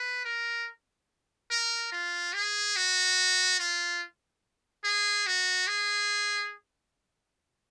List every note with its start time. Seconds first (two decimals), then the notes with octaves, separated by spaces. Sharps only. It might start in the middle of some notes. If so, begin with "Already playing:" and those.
Already playing: B4
0.25 A#4
1.51 A#4
1.92 F4
2.34 G#4
2.76 F#4
3.59 F4
4.84 G#4
5.27 F#4
5.67 G#4